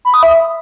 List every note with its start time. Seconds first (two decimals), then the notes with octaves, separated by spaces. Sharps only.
0.05 B5
0.14 D#6
0.23 E5